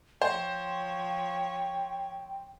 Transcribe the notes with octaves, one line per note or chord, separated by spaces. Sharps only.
F3 C5 C#5 G5